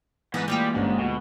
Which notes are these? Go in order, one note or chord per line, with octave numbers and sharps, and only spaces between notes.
G#2 E3 B3
G3 G#3 A#3 F4 G4
G1 G#2 C#4 D4
D2 B2 F#3